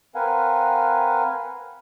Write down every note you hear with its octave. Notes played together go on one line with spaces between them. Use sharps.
C4 A#4 B4 F5 F#5 G#5